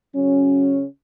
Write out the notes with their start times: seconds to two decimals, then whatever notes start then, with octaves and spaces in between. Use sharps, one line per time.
0.15 C#3 F#3 C#4